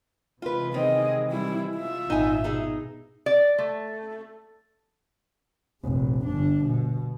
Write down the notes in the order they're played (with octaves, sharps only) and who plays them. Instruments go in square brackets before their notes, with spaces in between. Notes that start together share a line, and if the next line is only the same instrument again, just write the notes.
[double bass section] C3 E3 G#3 [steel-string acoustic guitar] F4 B4
[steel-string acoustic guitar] D#3 C4 [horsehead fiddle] G#4 D#5
[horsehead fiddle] G3 E4
F4 E5
[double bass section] G#1 A#2 [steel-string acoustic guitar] D#4 G#5
[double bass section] B2 [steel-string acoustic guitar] D#4 G#4
[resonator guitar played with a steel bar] D5
A3
[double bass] F1 A#1
G1 D4
B2